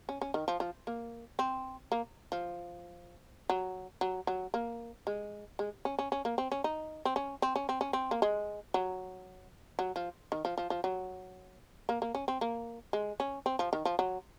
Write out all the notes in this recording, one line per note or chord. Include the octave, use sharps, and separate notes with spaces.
C#4
C#4
D#3
F3
F3
A#3
C4
A#3
F3
F#3
F#3
F#3
A#3
G#3
G#3
C#4
C#4
C#4
A#3
C4
C#4
D#4
C4
C#4
C4
C#4
C4
C#4
C4
A#3
G#3
F#3
F#3
F3
D#3
F3
F3
F3
F#3
A#3
A#3
C#4
C4
A#3
G#3
C#4
C4
F3
D#3
F3
F#3